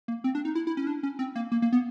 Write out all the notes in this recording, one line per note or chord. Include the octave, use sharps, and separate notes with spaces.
A#3
C4
D4
D#4
E4
E4
C#4
D4
C#4
C4
A#3
A#3
A#3
B3